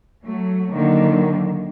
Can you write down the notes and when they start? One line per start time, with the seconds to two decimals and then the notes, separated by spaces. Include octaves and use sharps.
0.23 F#3 A3
0.74 D3 D#3 F#3 A#3